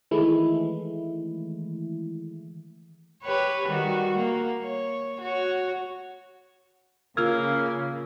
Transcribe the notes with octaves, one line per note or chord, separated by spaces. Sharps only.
D#3 E3 G#3 A3 E4
G4 B4 C#5
D#3 G3 F#4
A#3
C#5
F#4 C#5
C#3 A#3 F4 E6 F6 G#6